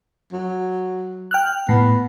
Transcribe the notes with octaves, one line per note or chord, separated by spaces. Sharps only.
F#3
G5 F6 F#6
A2 B3